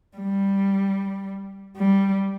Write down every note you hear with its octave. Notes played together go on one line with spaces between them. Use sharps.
G3
G3